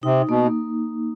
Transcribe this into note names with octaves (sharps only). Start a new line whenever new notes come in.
C3 D#4
B2 A#3